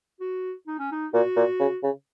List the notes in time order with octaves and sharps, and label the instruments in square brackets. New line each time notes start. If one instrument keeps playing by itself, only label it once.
[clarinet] F#4
D#4
C#4
D#4
[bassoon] A#2 [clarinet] F#4
[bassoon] A#2
C#3
C#3